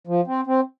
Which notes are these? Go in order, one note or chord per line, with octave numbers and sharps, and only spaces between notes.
F3
C4
C4